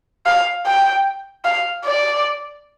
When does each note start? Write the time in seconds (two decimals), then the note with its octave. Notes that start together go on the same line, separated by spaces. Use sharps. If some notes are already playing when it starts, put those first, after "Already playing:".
0.26 F5
0.66 G5
1.45 F5
1.85 D5